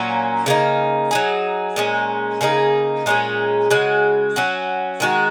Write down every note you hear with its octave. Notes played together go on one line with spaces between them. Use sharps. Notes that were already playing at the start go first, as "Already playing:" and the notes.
Already playing: A#2 F#3 A#3 C#4
C#3 A#3 D#4
F#3 D#4 G#4
A#2 G#3 C#4
C#3 A#3 D#4 G#4
A#2 G#3 C#4 G#4
C#3 G#3 F#4
F#3 C#4 F#4
D#3 G#3 F#4